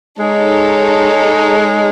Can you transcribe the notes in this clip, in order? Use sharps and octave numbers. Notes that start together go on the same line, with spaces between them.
G#3 D#4 A4 C#5